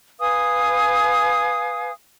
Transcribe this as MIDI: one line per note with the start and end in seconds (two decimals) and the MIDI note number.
0.20 1.92 71
0.20 1.92 77
0.20 1.92 80
0.20 1.92 87